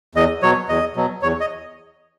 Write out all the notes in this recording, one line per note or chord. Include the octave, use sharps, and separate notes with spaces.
E2 D#5
B2 F#3 C#5
E2 D#5
B2 F#3
E2 C#5
D#5